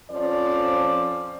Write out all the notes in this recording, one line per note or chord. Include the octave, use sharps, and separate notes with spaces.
F2 F3 C#4 D5